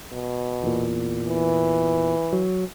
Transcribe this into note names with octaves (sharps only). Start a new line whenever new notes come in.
B2
E2 A#2
E3
F#3